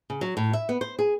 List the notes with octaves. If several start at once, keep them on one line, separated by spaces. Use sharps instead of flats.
C#3
F#3
A2
E5
B3
C5
G#4